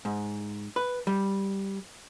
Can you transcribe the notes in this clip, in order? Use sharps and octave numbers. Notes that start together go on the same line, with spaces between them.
G#2
B4
G3